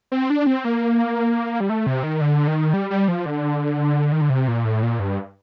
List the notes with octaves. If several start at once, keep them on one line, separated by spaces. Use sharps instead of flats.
C4
D4
C4
A#3
G3
A3
C3
D#3
D3
D#3
G3
G3
F3
D3
D#3
D3
C3
A#2
A2
A#2
G2